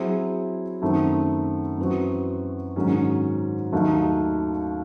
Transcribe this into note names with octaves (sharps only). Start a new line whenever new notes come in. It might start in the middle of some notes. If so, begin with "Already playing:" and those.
Already playing: F#3 C4 E4 G#4
F#2 D#3 A3 C4
F#2 E3 C4 F#4
G#2 D#3 F#3 C#4
D#2 D#3 F#3 A3 D#4